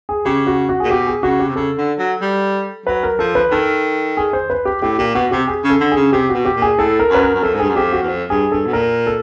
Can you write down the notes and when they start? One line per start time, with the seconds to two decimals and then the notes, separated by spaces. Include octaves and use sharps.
0.09 G#4
0.25 C#3 G4
0.47 F#4
0.69 F#4
0.80 A#2 G#4
0.90 B2 G4
1.07 G#4
1.23 C#3 F#4
1.40 G4
1.49 C3
1.56 C#3 A4
1.78 D3
1.99 F#3
2.21 G3
2.86 F#3 B4
3.03 A#4
3.19 F3 A4
3.35 B4
3.51 D#3 A4
4.17 G#4
4.33 C5
4.50 B4
4.65 G4
4.82 A2 G4
4.98 A#2 G4
5.15 B2 F#4
5.31 C3 G4
5.48 G#4
5.64 C#3
5.70 A4
5.80 D3
5.92 C#3 G#4
6.12 C3 G4
6.29 B2 F#4
6.45 G4
6.56 A#2
6.62 G#4
6.78 A2 A4
6.99 A#4
7.10 F#2 B4
7.22 A#4
7.35 F#2
7.43 F2 A4
7.54 G#2
7.60 G2 G#4
7.69 F#2
7.75 F2 G4
7.92 F#4
8.03 E2
8.08 F2
8.30 G2 G#4
8.52 G2 A4
8.67 B2
8.73 A#2 A#4
9.07 A4